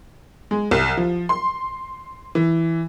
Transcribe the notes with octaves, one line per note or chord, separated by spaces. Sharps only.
G#3
C2
F3
C6
E3